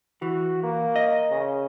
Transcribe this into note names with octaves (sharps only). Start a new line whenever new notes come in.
E3 F#4
A#3
D#5
C#3